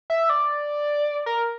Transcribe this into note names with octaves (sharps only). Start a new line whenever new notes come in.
E5
D5
A#4